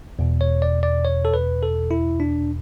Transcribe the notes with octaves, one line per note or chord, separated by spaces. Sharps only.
E2 B2
C#5
D5
D5
C#5
A4
B4
A4
E4
D4